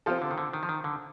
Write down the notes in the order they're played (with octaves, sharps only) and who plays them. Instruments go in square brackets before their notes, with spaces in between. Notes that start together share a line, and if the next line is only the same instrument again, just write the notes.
[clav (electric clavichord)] F3 [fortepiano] C4 F4 A4
[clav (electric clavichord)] D3
D#3
D3
D#3
F3
D#3
D3